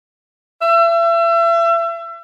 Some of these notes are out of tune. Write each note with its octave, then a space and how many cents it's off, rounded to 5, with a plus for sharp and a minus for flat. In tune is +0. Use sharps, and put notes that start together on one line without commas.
E5 +35